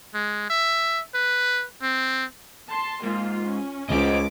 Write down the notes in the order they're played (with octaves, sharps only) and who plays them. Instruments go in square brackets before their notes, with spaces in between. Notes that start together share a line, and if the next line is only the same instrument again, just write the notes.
[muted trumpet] G#3
E5
B4
C4
[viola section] A5 C6
[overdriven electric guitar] G#2 [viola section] A#3 F4
[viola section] C#4
[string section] C#2 D6 [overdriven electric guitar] C5 D#5